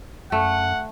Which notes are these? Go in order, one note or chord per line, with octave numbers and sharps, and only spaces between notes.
F#2 A3 F#5